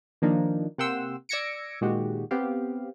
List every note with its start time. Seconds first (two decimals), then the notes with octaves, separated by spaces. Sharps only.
0.22 D#3 F3 A#3 D4 D#4
0.78 C3 A#3 F#5 G5 C6 E6
1.29 D5 E6 G#6 A#6 C#7 D7
1.81 A#2 D#3 G#3 F#4 G4
2.31 B3 C4 G4 F5